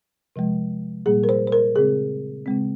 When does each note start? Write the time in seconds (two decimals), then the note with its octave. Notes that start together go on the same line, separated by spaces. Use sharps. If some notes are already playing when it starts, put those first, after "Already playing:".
0.36 C3 F3 G#3
1.06 A#2 G3 A#3 G#4
1.24 A#4
1.29 C5
1.47 C5
1.52 A#4
1.76 C#3 G#3 C4 G#4
2.46 C#3 G#3 C4